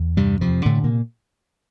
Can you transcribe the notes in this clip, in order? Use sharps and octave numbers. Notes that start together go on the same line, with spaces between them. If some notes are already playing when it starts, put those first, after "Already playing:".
Already playing: E2
G2 C3 G3
F2 C3 F3
A2 D3 A3
A#2 A#3